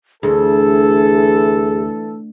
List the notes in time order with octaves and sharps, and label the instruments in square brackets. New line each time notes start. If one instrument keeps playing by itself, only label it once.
[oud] D2 [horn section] E3 A4 [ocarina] G#4